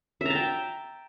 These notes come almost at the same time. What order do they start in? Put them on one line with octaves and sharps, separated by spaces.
E5 A#5 A5 G5